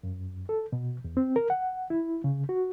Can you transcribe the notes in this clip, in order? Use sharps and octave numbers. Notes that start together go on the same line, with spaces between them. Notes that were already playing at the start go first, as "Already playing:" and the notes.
F#2
A4
B2
E2
C4
A#4
F#5
E4
C#3
F#4